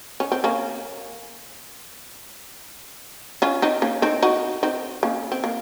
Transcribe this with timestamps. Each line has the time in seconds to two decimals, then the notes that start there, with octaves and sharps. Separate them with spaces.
0.20 C#4
0.32 C4
0.44 A#3 C#4
3.42 C#4 F4
3.62 C4 D#4
3.82 A#3 C#4
4.02 C4 D#4
4.23 D#4 F#4
4.63 C4 D#4
5.03 A#3 C#4
5.32 C4
5.44 A#3